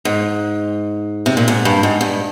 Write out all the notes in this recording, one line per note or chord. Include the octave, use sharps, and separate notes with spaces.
G#2
C3
A#2
G#2
G2
G#2
G2